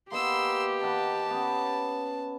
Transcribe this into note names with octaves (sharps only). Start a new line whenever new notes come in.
A#3 B3 G4 D#5 C6 E6
D#3 F#5 A5 B5
B3 C#4